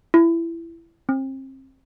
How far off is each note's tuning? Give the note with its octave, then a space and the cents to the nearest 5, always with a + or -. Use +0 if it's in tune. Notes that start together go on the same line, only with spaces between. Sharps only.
E4 +20
C4 +35